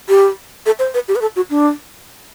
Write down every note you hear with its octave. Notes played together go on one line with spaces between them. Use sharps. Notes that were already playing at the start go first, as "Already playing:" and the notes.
G4
A4
C5
B4
G4
B4
A4
F#4
D4